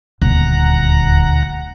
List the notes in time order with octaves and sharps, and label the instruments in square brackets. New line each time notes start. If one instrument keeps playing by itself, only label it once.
[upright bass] D#1 [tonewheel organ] D2 F#5 A#5